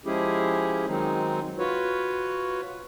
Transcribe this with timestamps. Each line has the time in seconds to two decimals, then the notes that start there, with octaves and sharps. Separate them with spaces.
0.05 F3 G#3 C#4 E4 G4 G#4
0.87 D#3 F#3 G#3 C4 D#4
1.59 F4 F#4 B4 C#5